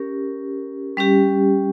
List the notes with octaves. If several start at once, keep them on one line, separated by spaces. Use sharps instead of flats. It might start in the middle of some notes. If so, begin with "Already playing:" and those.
Already playing: C#4 G4 A#4
G3 C#4 G4